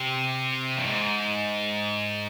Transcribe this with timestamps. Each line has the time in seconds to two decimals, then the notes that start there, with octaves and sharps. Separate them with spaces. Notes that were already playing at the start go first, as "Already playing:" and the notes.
Already playing: C3
0.78 G2
0.86 G#2